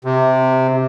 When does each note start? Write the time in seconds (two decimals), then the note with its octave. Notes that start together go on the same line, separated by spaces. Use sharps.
0.05 C3